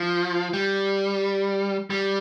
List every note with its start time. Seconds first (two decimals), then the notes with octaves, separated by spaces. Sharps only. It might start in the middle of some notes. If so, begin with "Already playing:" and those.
Already playing: F3
0.53 G3
1.90 G3